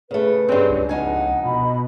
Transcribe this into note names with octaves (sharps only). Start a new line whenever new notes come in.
C#3 A3 G#4 B4
G2 C4 C#4
C#2
F2 D#4 F#5 G#5
B2 D#5 B5